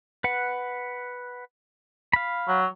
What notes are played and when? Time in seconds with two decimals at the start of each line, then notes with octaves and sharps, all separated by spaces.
0.24 B4 F#5
2.13 F5 B5
2.48 F#3